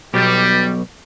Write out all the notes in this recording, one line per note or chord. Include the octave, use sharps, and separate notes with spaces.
B1 B2 G3 G4